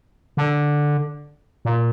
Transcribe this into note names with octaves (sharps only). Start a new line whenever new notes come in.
D3
A#2